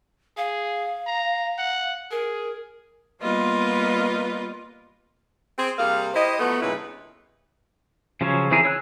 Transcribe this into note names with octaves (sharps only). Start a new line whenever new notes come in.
G#4 F5
A#5
F#5
G#4 A#4
G3 A#3 B3 F4 B4 D#5
C4 G#4
C3 G3 A#3 G#4 F5
E4 G4 C5 D#5
F3 F#3 A3 B3
G2 A#2 C#3 D#4 E4 B4
C#3 F3 F#3 C#4 C#5
E3 C4 E4 G#4 A#4
C#5 E6 F#6